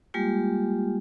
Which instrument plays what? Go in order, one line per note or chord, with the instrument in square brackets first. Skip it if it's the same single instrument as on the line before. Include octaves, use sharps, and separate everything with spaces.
[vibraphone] G3 G#3 A#3 F4 G4